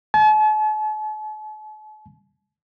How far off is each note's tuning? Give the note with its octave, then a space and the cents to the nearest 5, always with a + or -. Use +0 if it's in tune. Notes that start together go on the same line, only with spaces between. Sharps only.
A5 -45